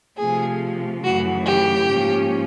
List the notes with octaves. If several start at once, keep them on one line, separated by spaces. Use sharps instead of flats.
C3 F3 A3 G#4
F#2 C#3 E3 A3 F#4
G4
G#2 F3 A#3 C#4